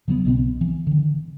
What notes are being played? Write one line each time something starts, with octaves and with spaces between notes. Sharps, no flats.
C#3 F#3 A3 B3
B1 B2 B3 C4
E3
D3 D#3